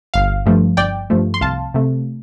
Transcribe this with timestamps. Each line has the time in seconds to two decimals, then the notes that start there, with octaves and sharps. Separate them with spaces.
0.14 G1 F5
0.46 G2 F3 A3
0.77 G1 D5 G5
1.10 G2 F3 A3
1.34 C6
1.41 C2 F5 A5
1.74 C3 A3